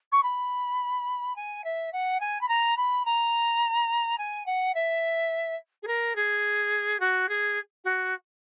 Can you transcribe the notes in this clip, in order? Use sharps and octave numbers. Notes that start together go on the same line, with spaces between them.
C#6
B5
G#5
E5
F#5
G#5
B5
A#5
B5
A#5
G#5
F#5
E5
G#4
A#4
G#4
F#4
G#4
F#4